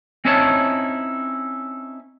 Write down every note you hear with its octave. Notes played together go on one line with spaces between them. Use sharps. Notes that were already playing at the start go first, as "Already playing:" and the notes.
C4 C#4 D#4 E4 C#5 A5